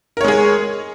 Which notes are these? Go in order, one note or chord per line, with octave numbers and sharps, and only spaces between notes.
G#3 G#4 A#4 C#5